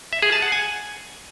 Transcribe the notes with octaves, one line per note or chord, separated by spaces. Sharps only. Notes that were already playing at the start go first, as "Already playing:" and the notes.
E5
G#4
A5
F#5
G#5